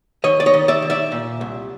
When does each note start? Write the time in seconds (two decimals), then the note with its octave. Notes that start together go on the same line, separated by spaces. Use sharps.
0.24 D#3 C#5 D#5
0.40 D5
0.46 C#5 D#5
0.54 D#3
0.68 D5 E5
0.82 D#3
0.90 D5 E5
1.12 A#2
1.41 C2